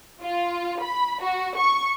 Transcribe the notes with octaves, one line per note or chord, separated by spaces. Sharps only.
F4
B5
F#4
C#6